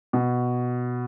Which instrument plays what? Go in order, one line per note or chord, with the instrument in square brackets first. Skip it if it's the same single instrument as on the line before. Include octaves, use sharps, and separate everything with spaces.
[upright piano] B2